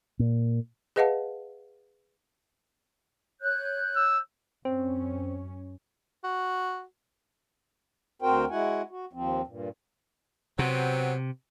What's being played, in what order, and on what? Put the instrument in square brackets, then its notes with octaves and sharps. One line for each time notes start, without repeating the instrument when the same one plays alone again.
[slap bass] A#2
[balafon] G#4 B4 D#5 F5 F#5 A5
[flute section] C#5 F#6 G6
[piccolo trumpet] E6
[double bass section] F#2 C#4 [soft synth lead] C4
[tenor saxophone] F#4
[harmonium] D2 C4 F#4 A#4 C5 G5
G#3 E4 F#4 F#5 G#5
F#4
D#2 F3 C4
G2 A#2
[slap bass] C3 [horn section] F#3 B3 C4